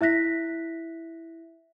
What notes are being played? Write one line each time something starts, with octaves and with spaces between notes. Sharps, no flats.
E4 E5 F#6 A#6 B6